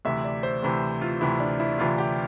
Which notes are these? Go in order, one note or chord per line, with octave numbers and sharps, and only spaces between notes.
D2 C3 E3 E5
D5
C5
D2 C3 E3
F4
D2 C3 E3 E4
D4
E4
D2 C3 E3 F4
G4